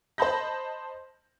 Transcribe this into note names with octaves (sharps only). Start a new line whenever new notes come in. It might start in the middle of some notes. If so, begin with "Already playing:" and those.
C5 D#5 A5 B5 G6 A#6